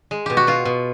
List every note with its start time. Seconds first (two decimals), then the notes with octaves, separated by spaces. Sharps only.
0.11 G#3
0.26 B2 G4
0.37 F#4
0.47 B2 F4
0.65 B2